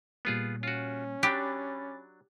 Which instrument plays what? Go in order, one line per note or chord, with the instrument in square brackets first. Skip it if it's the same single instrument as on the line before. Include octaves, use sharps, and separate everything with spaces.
[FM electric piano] A#2 G3 A#3 [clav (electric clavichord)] B3 F4 G#4
[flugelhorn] C#4 [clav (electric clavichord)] F4 F#4
[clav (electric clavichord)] F#3 D4 [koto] G4 [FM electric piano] B5 D6 A6